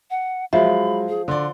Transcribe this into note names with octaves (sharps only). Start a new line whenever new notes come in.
F#5
F3 F#3 G#3 E5 B5
G#4
D3 D5 C6